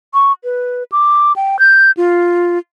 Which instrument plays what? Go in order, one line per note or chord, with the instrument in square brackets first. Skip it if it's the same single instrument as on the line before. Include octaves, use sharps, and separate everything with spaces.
[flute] C#6
B4
D6
G5
G6
F4